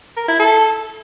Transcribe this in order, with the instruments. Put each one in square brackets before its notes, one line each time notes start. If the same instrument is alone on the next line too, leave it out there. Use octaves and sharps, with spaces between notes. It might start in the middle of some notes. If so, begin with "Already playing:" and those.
[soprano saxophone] A#4
E4
A4